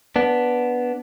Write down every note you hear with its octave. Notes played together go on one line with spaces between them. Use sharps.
B3 D4